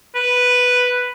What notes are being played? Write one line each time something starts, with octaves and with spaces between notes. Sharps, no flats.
B4